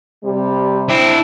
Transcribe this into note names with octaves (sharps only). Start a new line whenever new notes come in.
C3 G3
C4 D4 E4